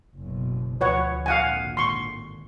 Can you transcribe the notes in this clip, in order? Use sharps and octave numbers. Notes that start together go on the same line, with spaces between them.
F#1 B2
D2 F3 B4 C#5 F#5
G#1 A#2 D3 F5 F#5 G#5
C6 C#6